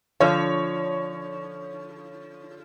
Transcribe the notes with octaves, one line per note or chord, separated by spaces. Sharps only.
D3 F3 C#5